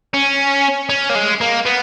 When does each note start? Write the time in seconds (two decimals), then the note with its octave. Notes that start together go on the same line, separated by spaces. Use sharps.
0.14 C#4
0.90 C#4
1.10 A#3
1.15 G#3
1.41 A#3
1.66 B3